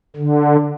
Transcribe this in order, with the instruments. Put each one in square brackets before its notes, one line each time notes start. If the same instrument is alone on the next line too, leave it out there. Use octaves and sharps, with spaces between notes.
[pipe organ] D3